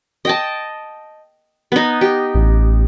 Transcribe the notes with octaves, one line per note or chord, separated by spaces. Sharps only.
D#5 G5 A5
B3 D#4
G4
A1